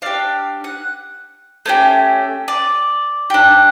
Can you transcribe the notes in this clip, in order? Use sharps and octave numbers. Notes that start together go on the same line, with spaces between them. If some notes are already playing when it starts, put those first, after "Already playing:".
D4 G4 F5
F#5
A3 C#4 E4 G4
D5
D4 G4